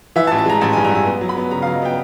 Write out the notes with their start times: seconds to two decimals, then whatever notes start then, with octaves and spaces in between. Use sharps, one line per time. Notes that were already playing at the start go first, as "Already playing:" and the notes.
0.16 E3 E5
0.27 A5
0.31 A1
0.38 A5
0.46 G#3 A#5
0.61 A1 A5
0.73 G#5
0.77 G2
0.84 A#5
0.91 A1 G#5
1.07 B3
1.21 F#3
1.29 B5
1.37 B3
1.51 C#3 A#5
1.62 F5
1.66 F#3
1.74 D#5
1.82 B3 G5